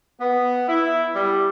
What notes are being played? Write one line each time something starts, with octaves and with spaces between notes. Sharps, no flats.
B3
E4
G3